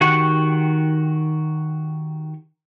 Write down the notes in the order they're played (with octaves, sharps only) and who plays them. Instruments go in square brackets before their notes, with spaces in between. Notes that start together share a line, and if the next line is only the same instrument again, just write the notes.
[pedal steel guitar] D#3 F#4 G4 F#5 C#6